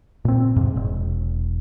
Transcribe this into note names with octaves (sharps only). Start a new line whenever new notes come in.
A#2 C4
F2 G#2 C3
E1